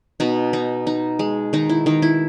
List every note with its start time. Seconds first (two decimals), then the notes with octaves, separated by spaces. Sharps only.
0.20 B2 D#4
0.53 D#4
0.87 D#4
1.19 G#3
1.53 D#3 D#4
1.69 E4
1.86 D#3 D#4
2.02 E4